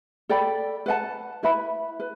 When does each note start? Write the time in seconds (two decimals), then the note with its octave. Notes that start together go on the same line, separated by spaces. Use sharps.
0.29 A4 D5 G5 B5
0.86 B4 F#5 A5
1.43 E4 B4 E5 B5
2.00 B4